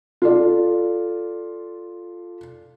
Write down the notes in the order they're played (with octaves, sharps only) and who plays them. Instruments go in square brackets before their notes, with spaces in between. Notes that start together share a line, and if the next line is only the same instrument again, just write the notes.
[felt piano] F4 A4 D5